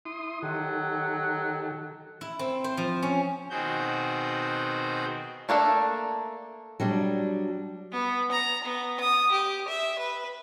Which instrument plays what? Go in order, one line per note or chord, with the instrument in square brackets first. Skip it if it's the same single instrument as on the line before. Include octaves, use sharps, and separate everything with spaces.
[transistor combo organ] E4 C6 D#6
[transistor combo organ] D#3 G4 A4 [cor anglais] F#3
[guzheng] E4
C4
C5
F3
C#4
[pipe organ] B2 D#3 C4 F#4 G#4 G6
[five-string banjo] A3 A#3 D4 A4
[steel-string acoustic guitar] F#3 G3 D4
[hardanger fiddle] B3
A#5
B3
D#6
G4
E5
B4